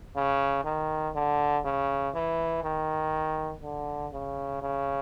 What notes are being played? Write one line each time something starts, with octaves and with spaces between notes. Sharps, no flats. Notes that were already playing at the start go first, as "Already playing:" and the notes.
C#3
D#3
D3
C#3
E3
D#3
D3
C#3
C#3